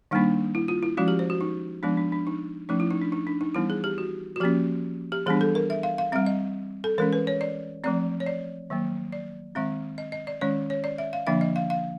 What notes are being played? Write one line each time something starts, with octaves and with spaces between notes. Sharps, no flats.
D#3 G3 A#3 D4 D#4
E4
F4
E4
F3 G#3 C#4 F#4
G4
C5
F#4
D#4
F3 G#3 B3 D4
D4
D4
D#4
F3 A3 C#4 D#4
E4
D#4
D4
D#4
D4
D#4
E3 G3 B3 E4
G#4
G4
F#4
F#4
F3 A#3 C#4 G4
G4
E3 G3 B3 D4 G#4
A4
A#4
E5
F5
F5
G3 C4 E5
D#5
A4
E3 G#3 C#4 A#4
B4
C#5
D5
F3 A3 C4 D5
C#5
D5
D#3 F#3 A#3
D5
D#3 G#3 C4 E5
D#5
D#5
D5
D#3 G#3 C#4 C#5
C#5
D5
E5
F5
D3 F3 A#3 D4 E5
D#5
F5
F5